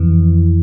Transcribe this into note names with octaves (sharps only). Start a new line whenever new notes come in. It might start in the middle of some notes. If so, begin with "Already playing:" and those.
Already playing: F2 E3